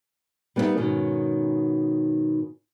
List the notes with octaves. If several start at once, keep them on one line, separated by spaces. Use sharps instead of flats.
G3 B3 D#4 E4 A#4 E5
G#2 B2 D#3 C#4